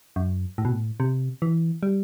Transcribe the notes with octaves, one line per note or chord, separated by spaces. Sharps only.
F#2
A2
B2
A2
C3
E3
G3